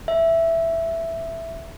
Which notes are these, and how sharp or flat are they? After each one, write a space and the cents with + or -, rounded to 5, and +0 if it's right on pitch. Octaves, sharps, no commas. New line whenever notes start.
E5 +5